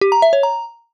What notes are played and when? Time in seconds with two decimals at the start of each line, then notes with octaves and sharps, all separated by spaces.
0.01 G4
0.12 A#5
0.22 E5
0.33 C#5
0.43 A#5